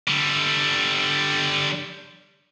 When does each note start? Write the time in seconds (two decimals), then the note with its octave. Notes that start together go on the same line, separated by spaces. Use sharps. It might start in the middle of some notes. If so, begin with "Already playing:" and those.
0.08 D3 G3